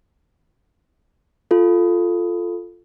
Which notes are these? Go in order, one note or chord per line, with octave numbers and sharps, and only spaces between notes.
F4 A4